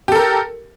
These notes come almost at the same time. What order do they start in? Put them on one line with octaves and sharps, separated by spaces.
G4 A4 A#4